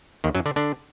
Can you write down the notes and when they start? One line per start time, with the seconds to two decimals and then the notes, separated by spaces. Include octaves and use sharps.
0.24 D#2 D#3
0.35 F#2 F#3
0.46 D3 D4
0.56 D3 D4